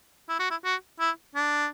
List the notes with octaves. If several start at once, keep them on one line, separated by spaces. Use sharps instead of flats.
E4
F#4
E4
F#4
E4
D4